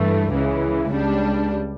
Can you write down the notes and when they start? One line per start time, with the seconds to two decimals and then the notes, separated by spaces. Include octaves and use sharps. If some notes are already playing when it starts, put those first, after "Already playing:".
Already playing: G2 E3 A3
0.32 C#2 C#3 E3
0.92 C#2 C#3 G3 D4